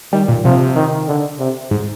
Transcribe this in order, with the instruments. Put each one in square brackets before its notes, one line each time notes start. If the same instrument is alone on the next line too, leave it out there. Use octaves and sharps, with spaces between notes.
[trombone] D#3 [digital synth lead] G3
[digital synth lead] A#2
[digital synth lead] C3 [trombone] F3
[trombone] D#3
D3
C3
[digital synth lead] G#2